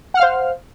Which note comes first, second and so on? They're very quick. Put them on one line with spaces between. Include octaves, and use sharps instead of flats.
F#5 F6 F5 C5